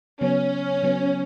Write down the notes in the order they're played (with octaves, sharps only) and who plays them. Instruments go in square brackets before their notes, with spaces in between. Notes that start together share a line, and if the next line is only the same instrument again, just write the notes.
[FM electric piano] C#3 F#3 B3 [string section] C#4
[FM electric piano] C#3 F#3 B3